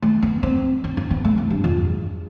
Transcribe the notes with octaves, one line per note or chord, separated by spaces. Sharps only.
A3
B3
C4
C4
C4
B3
A3
E3
G2
F2
E2